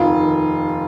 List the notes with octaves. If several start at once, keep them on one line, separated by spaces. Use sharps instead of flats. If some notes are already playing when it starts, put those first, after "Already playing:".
Already playing: F1 D#2 D#3 F4
D#2